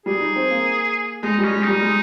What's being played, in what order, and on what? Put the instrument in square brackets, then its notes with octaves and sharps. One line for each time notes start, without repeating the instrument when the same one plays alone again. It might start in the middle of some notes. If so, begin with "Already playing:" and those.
[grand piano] G3 [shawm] G#4
[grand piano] D#4
C4
A#3
[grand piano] G#3 [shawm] D#4
[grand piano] G3 [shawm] C#4
[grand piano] G#3
[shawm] D#4
[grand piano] G3
G#3